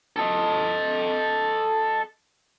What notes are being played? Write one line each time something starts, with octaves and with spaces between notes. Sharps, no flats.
A4 D#5